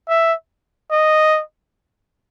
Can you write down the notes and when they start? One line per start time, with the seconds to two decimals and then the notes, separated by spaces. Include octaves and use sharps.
0.09 E5
0.91 D#5